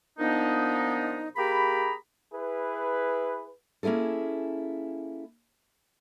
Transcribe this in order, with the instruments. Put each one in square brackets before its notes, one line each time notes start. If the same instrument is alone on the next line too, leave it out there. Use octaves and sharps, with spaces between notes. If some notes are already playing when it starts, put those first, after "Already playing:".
[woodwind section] A#2 F3 B3 D4 D#4
A#3 G4 G#4 A#5 B5
[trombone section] E4 G#4 B4
[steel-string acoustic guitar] A#3 C#4 E4 G#4 A4